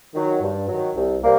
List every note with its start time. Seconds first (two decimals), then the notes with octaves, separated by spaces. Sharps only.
0.14 D#3 F#3
0.42 G2
0.68 D#3 F#3
0.95 C2
1.23 C3 G3 A#3